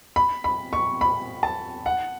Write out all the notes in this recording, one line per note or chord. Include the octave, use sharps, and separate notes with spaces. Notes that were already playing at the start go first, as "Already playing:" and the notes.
B5
B5
C#6
B5
A5
F#5